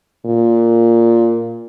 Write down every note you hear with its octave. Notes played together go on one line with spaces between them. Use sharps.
A#2